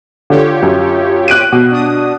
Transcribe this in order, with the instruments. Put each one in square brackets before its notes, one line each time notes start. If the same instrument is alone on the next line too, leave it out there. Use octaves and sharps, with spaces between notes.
[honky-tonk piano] D3 [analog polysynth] F4 G4 C#5
[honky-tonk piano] F#2
F#6 D7 D#7
B2
[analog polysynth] D4 D#6